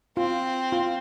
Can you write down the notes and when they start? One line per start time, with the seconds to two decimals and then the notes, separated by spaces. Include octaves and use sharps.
0.17 C4 F4
0.72 F4